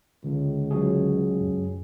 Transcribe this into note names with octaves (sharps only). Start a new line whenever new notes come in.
C#2 D3
F#3 C#4 G#4
F#2